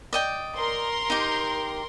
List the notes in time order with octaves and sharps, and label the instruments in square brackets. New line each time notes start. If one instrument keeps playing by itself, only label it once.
[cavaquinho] D5 D#5 G5
[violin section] A#4 C6
[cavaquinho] D#4 G4